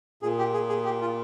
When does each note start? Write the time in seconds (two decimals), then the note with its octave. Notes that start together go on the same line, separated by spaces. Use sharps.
0.22 A#2 G#4
0.39 G4
0.54 G#4
0.69 G#4
0.85 G4
1.01 F4